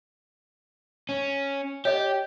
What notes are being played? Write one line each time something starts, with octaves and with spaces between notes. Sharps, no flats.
C#4
G4 C#5 D#5